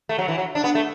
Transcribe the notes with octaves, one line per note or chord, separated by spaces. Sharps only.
A3
F#3
E3
F#3
D4
B3
A3